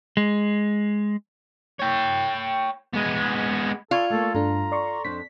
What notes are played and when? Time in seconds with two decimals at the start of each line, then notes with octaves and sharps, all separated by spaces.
0.17 G#3
1.80 C#5 G5
2.93 G#3 B3
3.91 F4 A4 D5 C#6 G#6
4.10 A3 A#3 A4
4.35 G2 D4 A4 A#5
4.72 D5 C6 C#6
5.05 F2 D4 C5 B6